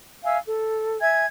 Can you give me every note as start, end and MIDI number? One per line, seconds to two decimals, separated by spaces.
0.23 0.38 76
0.23 0.38 77
0.23 0.38 80
0.23 0.38 88
0.46 0.97 69
1.00 1.25 76
1.00 1.25 80
1.00 1.25 92